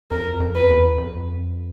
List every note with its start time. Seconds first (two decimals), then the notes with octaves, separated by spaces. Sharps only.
0.11 F2 A#4
0.40 F2
0.55 B4
0.70 E2
0.98 F2